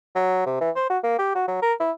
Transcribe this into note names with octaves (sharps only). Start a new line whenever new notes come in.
F#3
C3
E3
C5
F#4
A#3
G4
F#4
F#3
A#4
E4